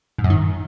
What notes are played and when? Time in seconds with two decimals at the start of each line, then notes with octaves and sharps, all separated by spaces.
0.18 G#2
0.24 F#2
0.30 D#3